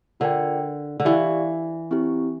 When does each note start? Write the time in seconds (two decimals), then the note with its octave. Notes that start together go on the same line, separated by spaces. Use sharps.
0.20 D3 F4 A#4 D5 G5
1.00 D3
1.05 E3 G4 D5 F5
1.91 C4 E4 G4